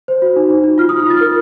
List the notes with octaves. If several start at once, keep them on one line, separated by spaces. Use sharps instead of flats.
C5
F#4
D#4
D#4
D#4
F4 F6
D#6
F4
F6
F4 A6
A#4